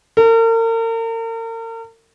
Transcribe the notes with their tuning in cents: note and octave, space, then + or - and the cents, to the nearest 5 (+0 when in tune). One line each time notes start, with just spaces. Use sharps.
A#4 -40